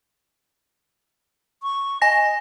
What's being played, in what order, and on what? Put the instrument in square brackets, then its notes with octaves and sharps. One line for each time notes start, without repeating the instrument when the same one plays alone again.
[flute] C#6
[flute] D#5 [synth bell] G#5 A#6